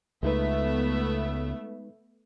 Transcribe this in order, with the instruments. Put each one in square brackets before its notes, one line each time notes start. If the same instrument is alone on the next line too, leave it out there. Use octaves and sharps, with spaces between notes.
[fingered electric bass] C#2 [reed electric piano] G#3 D#4 B4 [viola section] A3 B3 E5